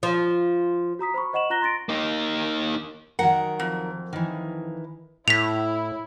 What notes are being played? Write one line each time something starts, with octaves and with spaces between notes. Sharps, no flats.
F3
F#4 A#5 D#6 B6
C5 B5 C#6
C5 D#5 F#5 C#6 E7 F#7
F4 A#5 F#6 A#6 G7
C6 A6 A#6 D7
A#3 D#4
D#3 F#3 A#4 F#5
F2
D#3 E3
A2 E4 B6 F7